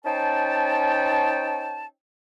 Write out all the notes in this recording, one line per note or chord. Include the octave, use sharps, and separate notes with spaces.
C#4 D#4 C5 G5 A5